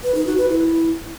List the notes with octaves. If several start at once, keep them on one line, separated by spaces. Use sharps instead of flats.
B4
D#4
F#4
B4
E4